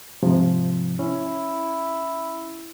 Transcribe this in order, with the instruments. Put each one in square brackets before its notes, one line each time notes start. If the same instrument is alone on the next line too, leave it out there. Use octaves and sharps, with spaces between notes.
[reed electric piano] G#2 C3 F3
[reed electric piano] C#4 [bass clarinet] E4